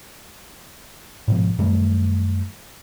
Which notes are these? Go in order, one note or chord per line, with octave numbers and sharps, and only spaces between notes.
G#2 B2 F3
F#2 D#3 G3 A3